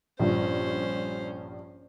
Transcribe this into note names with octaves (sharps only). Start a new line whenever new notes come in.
A#1 G2 C#4 C5